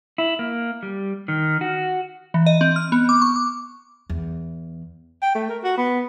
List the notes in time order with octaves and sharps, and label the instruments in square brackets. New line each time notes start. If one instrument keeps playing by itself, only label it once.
[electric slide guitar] E4
A#3
G3
D#3
F#4
[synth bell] E3
D#5
C4
F6
B3
D6
C#6
D6
[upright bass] E2
[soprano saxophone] G5
A3
A#4
F#4
B3